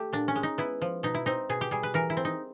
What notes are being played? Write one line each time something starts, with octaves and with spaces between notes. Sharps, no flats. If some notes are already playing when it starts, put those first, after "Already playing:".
Already playing: A3 G4
A#2 D4
C#4
G#3
D#4
B3 E4
F3
B2 D#4
E4
C4 D#4
B2 G#4
G4
G3 G#4
B4
E3 A#4
E4
C4
D#4